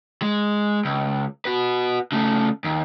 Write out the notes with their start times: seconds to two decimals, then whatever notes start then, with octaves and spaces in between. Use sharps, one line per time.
0.22 G#3
0.85 C#2
1.45 F#4 B4
2.12 C#3 A3
2.64 D#2